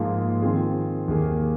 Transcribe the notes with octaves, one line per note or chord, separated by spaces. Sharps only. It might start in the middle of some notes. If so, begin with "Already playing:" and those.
Already playing: G#2 F3 A#3 F4 G#4
D#3 C4 F4 G#4
D#2 D#3 A#3 G#4